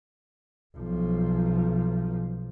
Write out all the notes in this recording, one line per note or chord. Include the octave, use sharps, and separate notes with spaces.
B1 F3